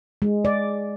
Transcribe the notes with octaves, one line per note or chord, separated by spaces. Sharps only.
G#3
D5